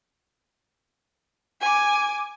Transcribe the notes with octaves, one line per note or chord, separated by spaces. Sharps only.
G#5 D6